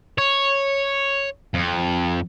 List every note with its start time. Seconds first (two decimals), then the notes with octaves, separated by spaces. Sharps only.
0.18 C#5
1.54 F2